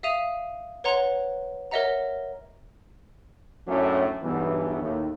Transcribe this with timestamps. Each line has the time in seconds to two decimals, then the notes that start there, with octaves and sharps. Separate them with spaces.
0.03 E5 F5 D#6 D#7 F7
0.84 B4 C#5 F#5 A#5 C6
1.71 A#4 C#5 D#5 E5 F#5 A#5
3.67 F#2 A2 F#3 A3 C#4 D4
4.22 B1 E2 G2 B2 E3
4.82 D#2 A2